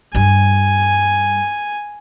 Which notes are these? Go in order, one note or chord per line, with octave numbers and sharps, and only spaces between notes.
G2 G3 G#5